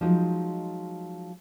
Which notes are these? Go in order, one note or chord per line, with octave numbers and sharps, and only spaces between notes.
F3 F#3 G#3 D#4